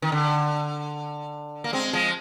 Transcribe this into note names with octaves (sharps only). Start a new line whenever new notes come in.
D#3
D3
A#3
G#3 C4
F3 G#3